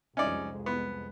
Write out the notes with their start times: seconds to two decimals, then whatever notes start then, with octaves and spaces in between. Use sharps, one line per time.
0.17 C2 F2 G#3 C#4 D#4 D5
0.66 B3